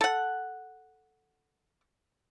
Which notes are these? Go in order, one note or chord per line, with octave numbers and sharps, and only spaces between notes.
A4 F#5